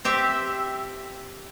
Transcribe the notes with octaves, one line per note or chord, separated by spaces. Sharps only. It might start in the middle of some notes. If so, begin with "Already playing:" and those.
C4 G4 E5